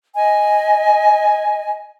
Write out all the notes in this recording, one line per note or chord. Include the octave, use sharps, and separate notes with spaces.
D#5 G#5